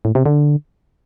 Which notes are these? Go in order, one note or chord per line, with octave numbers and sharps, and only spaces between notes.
A2
C3
D3